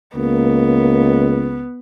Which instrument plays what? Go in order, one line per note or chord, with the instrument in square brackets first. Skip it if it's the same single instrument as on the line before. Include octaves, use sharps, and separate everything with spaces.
[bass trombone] C#2 [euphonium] A#3 [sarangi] B3